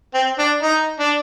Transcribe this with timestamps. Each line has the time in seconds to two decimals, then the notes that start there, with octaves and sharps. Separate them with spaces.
0.14 C4
0.39 D4
0.63 D#4
0.99 D4